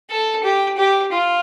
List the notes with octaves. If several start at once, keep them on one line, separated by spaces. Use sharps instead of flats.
A4
G4
G4
F4